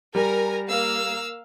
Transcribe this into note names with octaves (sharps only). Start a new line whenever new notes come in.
G3 A#4 G#5 A#5
A#3 F5 E6